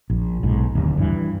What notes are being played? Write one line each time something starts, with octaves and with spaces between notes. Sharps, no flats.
A#1
B1 G#2
D1 D#2
G2 D3 E3